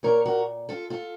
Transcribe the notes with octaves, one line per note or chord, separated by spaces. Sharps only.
A#2 A#4 C#5
F#4 A#4
F4 A4
F4 A4